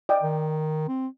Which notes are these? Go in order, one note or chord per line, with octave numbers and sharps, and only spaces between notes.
D5 D#5 G5
D#3
C4